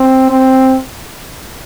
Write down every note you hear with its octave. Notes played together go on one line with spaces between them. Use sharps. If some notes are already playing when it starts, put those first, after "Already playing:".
Already playing: C4
C4